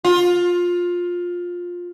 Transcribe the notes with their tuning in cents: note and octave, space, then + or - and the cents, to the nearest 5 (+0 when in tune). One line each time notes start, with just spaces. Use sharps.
F4 +15